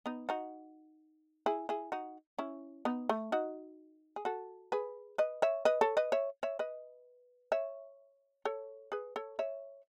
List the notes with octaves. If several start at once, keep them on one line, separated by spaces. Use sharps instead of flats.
B3 D#4
D#4 F#4
E4 G#4
E4 G#4
D#4 F#4
C#4 E4
B3 D#4
A3
D#4 F#4
G#4
F#4 A4
G#4 B4
B4 D#5
C#5 E5
B4 D#5
A4 C#5
B4 D#5
C#5 E5
C#5 E5
B4 D#5
C#5 E5
A4 C#5
G#4 B4
A4 C#5
C#5 E5